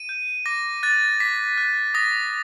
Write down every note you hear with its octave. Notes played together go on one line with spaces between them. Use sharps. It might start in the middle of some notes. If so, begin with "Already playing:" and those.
Already playing: D#7
G6
D6 A#6
F#6 A6
D6 B6
F#6
D#6 A#6